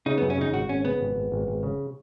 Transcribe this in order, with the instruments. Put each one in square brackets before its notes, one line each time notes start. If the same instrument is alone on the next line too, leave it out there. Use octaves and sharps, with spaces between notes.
[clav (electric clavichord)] C#3 [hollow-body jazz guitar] D#4
[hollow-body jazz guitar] B3
[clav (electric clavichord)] F#2
[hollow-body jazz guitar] C#4
[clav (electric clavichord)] C#3 [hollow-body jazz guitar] D#4
[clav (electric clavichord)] G#1 [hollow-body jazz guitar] F#4
[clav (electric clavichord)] G#1 [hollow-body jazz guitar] C#4
[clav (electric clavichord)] C#3 [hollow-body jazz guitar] B3
[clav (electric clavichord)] G#1
G#1
G#1
G#1
C#3